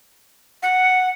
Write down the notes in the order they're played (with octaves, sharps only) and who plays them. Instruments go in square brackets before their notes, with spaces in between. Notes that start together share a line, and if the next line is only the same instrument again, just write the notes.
[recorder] F#5